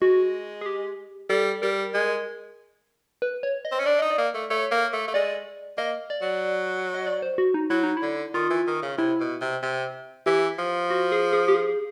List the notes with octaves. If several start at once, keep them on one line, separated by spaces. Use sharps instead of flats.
G#3 F#4
G#4
G4
G3 A4
G3 A#4
G#3
B4
C#5
D#5
C4
C#4
D4 D5
D#4 D#5
D5
A#3
A3
A3 C#5
A#3
A3
A3
G#3 D5
A#3 D#5
D5
F#3
D#5
D5
C5
F#4
D#4
F#3 E4
D#4
E4
D3
D#3 F4
E3
D#3
C#3
C3 E4
B2
C3
C3
E3 G4
F3
F#4
G#4
G#4
G4
G#4